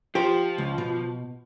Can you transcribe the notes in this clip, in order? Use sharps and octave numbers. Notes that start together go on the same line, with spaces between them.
F3 F4 G4 C5
C#2
B2